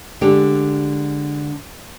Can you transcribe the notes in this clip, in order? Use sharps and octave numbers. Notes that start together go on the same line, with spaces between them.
D3 G#3 D4 G4